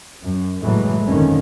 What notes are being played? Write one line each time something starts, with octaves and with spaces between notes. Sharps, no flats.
F#2
F#1 A2 E3 F#3 G#3 A3
G1 F2 A#2 D3 D#3 C#4